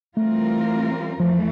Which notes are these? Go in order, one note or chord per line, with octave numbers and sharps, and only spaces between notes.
E3 G3 A3 C4 F4 A#4
F2 E3 F3 A3